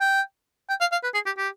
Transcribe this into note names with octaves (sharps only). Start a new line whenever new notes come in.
G5
G5
F5
F5
B4
G#4
G4
G4